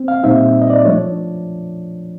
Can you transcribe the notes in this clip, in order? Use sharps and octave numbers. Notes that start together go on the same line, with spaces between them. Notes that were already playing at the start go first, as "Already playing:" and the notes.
Already playing: C4
F5
A#2 G3 C4 D#4 E5
D#5
D5
F3 A3 D4 C#5